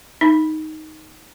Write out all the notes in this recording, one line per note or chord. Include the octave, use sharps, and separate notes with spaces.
D#4